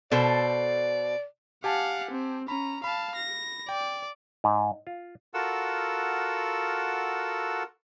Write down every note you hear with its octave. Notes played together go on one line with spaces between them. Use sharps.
B2 A4 C5 D5
G4 F5 F#5 G#5 A5
C4
C#4 A#5 B5
F5 A5 B5
A#6
D5 G5
G#2
F4
F4 F#4 A4 A#4 F#5 E6